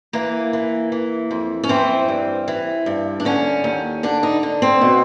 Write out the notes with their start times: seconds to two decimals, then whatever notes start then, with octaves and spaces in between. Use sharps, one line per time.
0.13 E3 A#3
0.53 E3
0.92 E3
1.31 F2
1.64 C#4
1.69 E3 C4
2.08 G2
2.48 E3
2.86 G2
3.20 D4
3.25 D3 C#4
3.64 D#2
4.03 D3 D4
4.23 D#4
4.43 D3
4.62 C4
4.81 B2